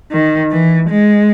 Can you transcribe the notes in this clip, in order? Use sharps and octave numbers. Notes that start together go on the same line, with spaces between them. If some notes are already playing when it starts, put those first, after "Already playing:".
D#3
E3
G#3